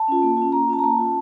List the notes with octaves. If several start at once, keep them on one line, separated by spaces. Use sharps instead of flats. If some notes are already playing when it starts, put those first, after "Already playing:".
Already playing: A5
C#4 F4
A#3
C#4 F4
A#3 A#5
C#4 F4 A5
A#5
A#3 A5
C#4 F4